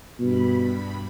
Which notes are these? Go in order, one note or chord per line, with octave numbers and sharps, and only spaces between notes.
G2 B2 B5